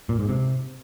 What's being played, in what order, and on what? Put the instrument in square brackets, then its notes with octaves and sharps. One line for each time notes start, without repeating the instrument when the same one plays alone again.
[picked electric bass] A#2
G#2
C3